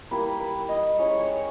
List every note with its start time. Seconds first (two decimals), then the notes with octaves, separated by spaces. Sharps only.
0.11 G3 A#3 E4 B4
0.41 B4
0.69 D#5
0.98 G#3 C#4 E4 C#5
1.20 C#5